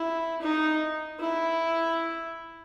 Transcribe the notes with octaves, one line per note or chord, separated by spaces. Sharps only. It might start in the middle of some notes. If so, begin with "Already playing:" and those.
Already playing: E4
D#4
E4